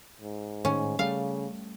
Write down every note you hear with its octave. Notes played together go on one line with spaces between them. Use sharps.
G#2
A2 D#3 C#4
C#3 G3 A3 F5